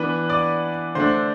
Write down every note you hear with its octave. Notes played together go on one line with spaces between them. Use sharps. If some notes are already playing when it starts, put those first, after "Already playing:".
Already playing: E3 B3 D4 B4 B5
D5 D6
D3 A3 D4 C5 C6